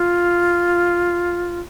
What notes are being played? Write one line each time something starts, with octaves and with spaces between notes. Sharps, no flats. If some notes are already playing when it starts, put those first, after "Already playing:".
Already playing: F4